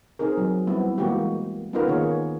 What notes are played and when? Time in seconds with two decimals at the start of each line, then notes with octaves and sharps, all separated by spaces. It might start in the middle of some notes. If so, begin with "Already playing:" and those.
0.19 C4 D#4 G#4 A#4
0.37 F#3
0.67 G3 B3 C4 E4
0.98 E3 G#3 A#3 B3 F#4 G4
1.73 B3 C#4 D#4 F4 A#4 B4
1.88 D#3 A#3 G#4 C#5